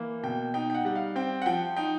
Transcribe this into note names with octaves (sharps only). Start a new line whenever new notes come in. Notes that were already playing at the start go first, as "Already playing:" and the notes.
Already playing: E3 A#3
B2 G5
D#4 G5
G5
F#5
G3 F#5
F5
C4 G5
F#5
F3 G5
D#4 G5